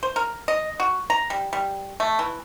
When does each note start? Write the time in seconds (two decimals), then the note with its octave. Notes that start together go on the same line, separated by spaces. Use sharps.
0.03 C5
0.16 A#4
0.48 D#5
0.80 F#4
1.10 A#5
1.30 G3
1.53 G3
2.00 A3
2.19 E3